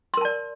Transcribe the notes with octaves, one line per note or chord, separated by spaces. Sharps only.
A#4 D5 A5 C6